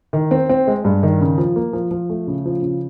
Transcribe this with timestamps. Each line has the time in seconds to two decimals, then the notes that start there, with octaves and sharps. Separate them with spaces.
0.13 D#3
0.31 C4
0.49 C4
0.67 G#3
0.85 G2
1.03 D#3
1.21 C#3
1.38 F3
1.56 A#3
1.73 F3
1.91 F3
2.09 A3
2.27 C#3
2.45 F3
2.62 C#3